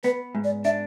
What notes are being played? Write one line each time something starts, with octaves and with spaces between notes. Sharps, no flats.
B3 B4
G#2
D5
D4 E5